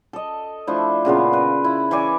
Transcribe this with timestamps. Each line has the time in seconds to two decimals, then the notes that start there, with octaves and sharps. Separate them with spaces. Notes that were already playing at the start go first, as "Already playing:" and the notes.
0.13 A4 D#5
0.67 F3 A3 D4 E4
1.05 A#2 C#3 B3 F4
1.33 A#4 B4
1.64 E4
1.91 E3 C#5 D5 G#5